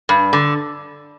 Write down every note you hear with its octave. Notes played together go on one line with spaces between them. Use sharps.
G2
D3